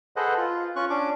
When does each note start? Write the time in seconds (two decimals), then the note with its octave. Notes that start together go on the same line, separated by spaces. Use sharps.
0.16 G#4 A4 B4 C5 D#5 F#5
0.38 F4
0.76 C#4 F4 C#6 F#6
0.90 C#4 D4 D6